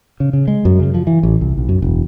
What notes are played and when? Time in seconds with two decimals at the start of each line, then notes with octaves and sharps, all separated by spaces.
0.20 C#3
0.33 C#3
0.48 G#3
0.65 F#2
0.79 C#3
0.94 F3
1.07 E3
1.23 A1
1.41 C2
1.58 B1
1.69 F#2
1.82 E1